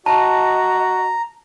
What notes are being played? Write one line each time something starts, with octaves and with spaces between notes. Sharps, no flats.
F#4 D#5 A5 A#5